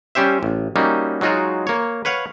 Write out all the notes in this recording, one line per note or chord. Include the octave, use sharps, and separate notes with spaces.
G3 C#4 G4 C5 E5
A1
G3 A#3 C#4 D#4 F#4
F#3 G#3 D#4 F4 F#4
A#3 C#5
B4 C#5 F5 F#5